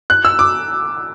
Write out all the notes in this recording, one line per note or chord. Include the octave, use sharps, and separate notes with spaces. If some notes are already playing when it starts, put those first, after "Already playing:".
F#6
E6
D6